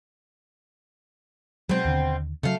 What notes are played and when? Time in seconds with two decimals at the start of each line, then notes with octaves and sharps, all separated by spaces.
1.69 B2 F#3 G#3 C4
1.85 D#2 D3
2.43 C#3 F#3 A3 F5